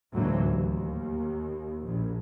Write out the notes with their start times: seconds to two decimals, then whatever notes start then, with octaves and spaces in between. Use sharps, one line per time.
0.13 A1 D2 G#2 E3 F#3 A#3
0.49 D#2
1.82 A#1